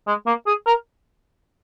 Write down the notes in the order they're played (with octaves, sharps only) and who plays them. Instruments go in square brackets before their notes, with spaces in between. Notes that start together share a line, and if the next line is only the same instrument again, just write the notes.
[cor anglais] G#3
A#3
G#4
A#4